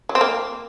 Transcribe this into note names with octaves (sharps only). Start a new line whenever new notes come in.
F#3
C4
A#3